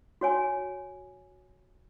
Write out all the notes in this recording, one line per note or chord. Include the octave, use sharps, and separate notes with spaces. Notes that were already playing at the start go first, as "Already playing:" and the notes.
F#4 C#5 G#5